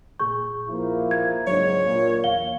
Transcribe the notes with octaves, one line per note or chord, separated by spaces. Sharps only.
A#2 G#4 C#6 G6
F3 A#3 E4
G#6
C#2 G#2 F#3 D4 C#5
A#2
E2 F5 G7